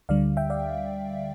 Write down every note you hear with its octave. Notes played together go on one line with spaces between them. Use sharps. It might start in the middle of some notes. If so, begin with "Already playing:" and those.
D2 D3 G3 D5 F5
E5 G5
D5 F5